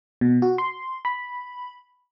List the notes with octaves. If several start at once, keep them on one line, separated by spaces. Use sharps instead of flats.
B2
F#4
C6
B5